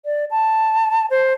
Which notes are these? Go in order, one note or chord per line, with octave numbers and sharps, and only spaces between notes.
D5
A5
C5